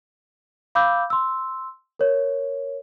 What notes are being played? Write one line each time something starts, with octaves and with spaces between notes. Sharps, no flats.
F5 B5 D6 E6 G6
C6 E6
A#4 C#5